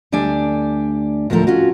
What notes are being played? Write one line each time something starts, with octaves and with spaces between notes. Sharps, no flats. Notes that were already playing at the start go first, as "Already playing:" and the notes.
D2 G3 D4 D5 G#5
D2 A2 F3 E4 A4 A#4
C#4 F4 F#4